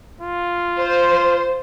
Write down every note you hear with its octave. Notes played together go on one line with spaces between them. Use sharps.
F4
C5